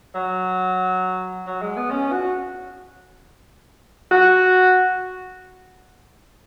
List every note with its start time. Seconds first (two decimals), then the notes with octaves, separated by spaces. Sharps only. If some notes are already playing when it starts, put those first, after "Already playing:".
0.15 F#3
1.47 F#3
1.62 G#3
1.77 B3
1.91 C#4
2.12 F#4
4.12 F#4